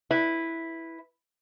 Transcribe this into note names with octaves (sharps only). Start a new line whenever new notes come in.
E4 B4